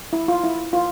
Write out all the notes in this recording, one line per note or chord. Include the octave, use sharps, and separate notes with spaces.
E4
F4
E4
F4